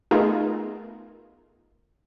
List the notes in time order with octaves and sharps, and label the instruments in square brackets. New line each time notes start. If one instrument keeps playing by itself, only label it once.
[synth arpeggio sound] A3 B3 D#4 F4 G#4 A#4